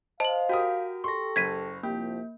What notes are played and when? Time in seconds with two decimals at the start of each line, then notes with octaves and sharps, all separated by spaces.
0.20 C5 D#5 F5 A5 F#7
0.49 F#4 G4 A#4 D#6
1.04 G4 A4 C6 C#6 A#6
1.36 F#1 G#6 B6 D#7
1.83 C2 F3 A#3 G4